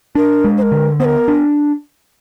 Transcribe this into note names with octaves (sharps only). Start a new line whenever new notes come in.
D4 A#4
G#3
C5
A#4
D3
B3 C5
A#4
D4